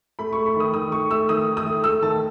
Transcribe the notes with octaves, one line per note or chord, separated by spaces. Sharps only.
A3 B5
A3 C#6
B5
D#3 D#6
D#3 D#6
A3 C#6
A3 E6
D#3 D#6
D#3
D#6
A3
A3 E6
D#3 A5